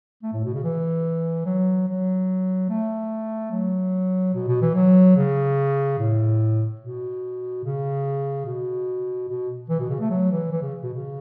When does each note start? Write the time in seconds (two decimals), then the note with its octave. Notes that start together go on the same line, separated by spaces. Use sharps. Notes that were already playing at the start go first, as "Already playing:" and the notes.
0.23 A3
0.33 A2
0.44 B2
0.54 C#3
0.64 E3
1.45 F#3
1.88 F#3
2.69 A3
3.52 F#3
4.34 B2
4.48 B2
4.61 E3
4.75 F#3
5.17 C#3
5.99 A2
6.81 B2
7.64 C#3
8.46 B2
9.28 B2
9.69 E3
9.79 B2
9.89 C#3
10.00 A3
10.10 F#3
10.31 E3
10.52 E3
10.62 C#3
10.83 B2
10.93 C#3